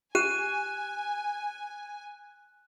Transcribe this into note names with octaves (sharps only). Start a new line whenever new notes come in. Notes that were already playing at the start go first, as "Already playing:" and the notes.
G4 G#5 F#6 D#7 E7